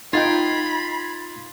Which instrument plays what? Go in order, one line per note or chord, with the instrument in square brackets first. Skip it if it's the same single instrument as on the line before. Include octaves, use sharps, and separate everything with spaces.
[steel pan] D#4 G5 [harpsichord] F4 [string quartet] B5 [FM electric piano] G#6 A6 C7